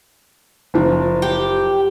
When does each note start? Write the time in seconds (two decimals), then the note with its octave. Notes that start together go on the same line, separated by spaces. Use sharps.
0.74 F#1 F3
1.22 G4